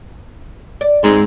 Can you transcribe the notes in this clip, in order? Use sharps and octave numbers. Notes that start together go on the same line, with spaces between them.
D5
G#2 G#3 C4